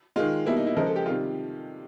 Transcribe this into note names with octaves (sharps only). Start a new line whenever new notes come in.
D#3 G#3 F4
B2 G3 A#3 E4
D#4
E4
C#3 F3 G#3 A#4
A4
G4
C3 D#3 G3 F4